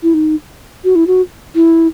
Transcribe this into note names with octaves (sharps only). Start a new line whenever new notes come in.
E4
D#4
F#4
E4
F#4
E4